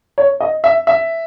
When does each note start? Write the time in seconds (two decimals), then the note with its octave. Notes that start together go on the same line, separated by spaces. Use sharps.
0.18 C#5
0.40 D#5
0.64 E5
0.87 E5